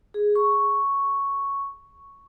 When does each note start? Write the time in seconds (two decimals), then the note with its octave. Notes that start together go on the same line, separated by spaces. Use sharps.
0.14 G#4
0.35 C#6